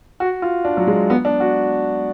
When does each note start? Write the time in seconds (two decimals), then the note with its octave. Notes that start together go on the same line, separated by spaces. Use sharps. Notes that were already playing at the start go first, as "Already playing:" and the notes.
0.20 F#4
0.42 F4
0.65 D4
0.77 F#3
0.87 G#3
1.10 B3
1.25 D4
1.40 F#4